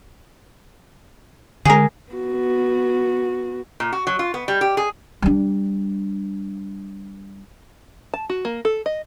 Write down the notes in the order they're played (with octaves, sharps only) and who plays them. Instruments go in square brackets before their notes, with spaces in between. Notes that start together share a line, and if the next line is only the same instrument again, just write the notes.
[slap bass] D3 G#3 [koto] G#4 A#4
[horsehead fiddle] B3 F#4
[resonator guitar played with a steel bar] A#2
F#4
F#3
F4
B3
G3
G4
G#4
[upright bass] G3 D4
[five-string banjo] A5
F#4
A#3
A4
D#5